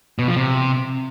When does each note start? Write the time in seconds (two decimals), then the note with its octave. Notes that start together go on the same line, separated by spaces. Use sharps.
0.19 B2
0.27 F3
0.36 C3